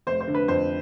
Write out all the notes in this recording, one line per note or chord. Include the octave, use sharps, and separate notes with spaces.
F1 C5
C5
D3
B4
F2 C5